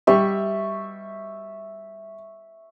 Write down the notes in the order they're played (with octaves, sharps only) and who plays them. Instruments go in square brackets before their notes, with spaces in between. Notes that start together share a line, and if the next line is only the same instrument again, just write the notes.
[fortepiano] G3 [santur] E5 C#6